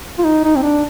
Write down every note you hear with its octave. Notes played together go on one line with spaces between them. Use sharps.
F4
D#4
D#4
C4
D4